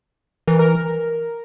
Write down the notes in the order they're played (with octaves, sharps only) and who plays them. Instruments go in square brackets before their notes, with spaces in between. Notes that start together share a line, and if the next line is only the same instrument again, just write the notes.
[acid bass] E3 [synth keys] A#4
[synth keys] A#4